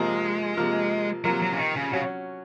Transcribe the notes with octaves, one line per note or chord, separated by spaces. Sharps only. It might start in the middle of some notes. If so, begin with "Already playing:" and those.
Already playing: C3 F3 G#3 A#3 F4 A#4
C3 F3 A#3 F4 A#4
C3 F3 F#3 A#3 F4 A#4
F#3
C#3
D#3
C#3
C#3 F#3 C#4 F#4